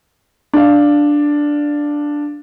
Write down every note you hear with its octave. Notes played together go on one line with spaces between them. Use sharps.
D4 F5